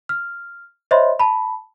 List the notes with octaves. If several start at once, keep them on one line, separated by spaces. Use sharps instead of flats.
F6
C5 C#5 D#5 E5 B5 C6
A5 B5